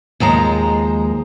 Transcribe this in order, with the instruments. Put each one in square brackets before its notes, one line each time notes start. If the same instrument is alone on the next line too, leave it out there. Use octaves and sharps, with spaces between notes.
[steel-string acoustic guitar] D#2 F3 G#3 A#5